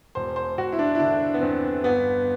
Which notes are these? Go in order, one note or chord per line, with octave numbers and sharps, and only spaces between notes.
E1 C5
C5
E1 F#4
E4
D4
E4
D3 D4
B3
E2 C4
G1 B3